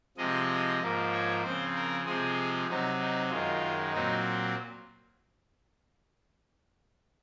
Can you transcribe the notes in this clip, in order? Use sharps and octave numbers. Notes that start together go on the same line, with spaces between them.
C3 F3 G#3 D#5
G#2 F3 A#3
C#5
C#3 F3 C4 C5
A#4
C3 F3 G#3 C4 G#4
C3 F#3 C4 D#4
D#4
F#2 D#3 G#3 F4
A#2 F#3 C4 D#4